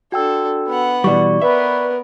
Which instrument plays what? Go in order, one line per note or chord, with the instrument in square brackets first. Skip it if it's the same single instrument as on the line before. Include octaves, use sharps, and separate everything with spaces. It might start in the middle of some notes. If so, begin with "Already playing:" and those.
[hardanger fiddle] D4 A4 [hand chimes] F#4 G5 E6
[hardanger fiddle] B3 F#5
[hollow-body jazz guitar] B2 E3 G3 [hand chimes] D5 C#6
[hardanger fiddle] B3 A#4 [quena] B4 [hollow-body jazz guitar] E5